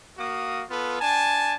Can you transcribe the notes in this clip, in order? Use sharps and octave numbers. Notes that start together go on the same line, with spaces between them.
A#3 F#4 F5 D#6
B3 F4 A4 B4
D4 G#5 A5